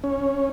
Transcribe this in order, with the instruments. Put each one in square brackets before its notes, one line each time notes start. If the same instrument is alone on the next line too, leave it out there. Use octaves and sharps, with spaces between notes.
[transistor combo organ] C#4